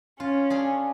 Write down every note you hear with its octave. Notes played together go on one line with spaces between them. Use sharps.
C#4 F4
D4 G#4